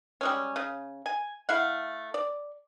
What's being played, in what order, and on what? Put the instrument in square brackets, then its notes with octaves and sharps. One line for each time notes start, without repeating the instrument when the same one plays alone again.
[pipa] G3 G#3 C#4
C#3
G#5
A3 E4 F5 F#5
D5